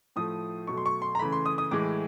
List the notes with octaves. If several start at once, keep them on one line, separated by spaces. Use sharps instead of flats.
A2 F3 A3 D#6
B2 F#3 A3 C#6
C6
C#6
C6
A#5
C#3 E3 A3 B5
C6
D#6
D#6
A2 E3 G#3 D6